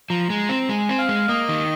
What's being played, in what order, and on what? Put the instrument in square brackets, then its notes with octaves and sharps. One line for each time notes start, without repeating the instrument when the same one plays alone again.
[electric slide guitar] F3 [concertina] A#5
[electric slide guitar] G#3
C4
[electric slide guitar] G#3 [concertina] G#5
[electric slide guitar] C4
[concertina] F5
[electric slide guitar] G#3
[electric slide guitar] A#3 [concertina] D#5
[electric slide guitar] D#3